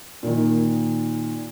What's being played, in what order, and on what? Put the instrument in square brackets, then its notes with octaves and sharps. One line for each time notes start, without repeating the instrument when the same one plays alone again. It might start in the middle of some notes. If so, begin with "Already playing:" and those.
[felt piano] A#2 D#3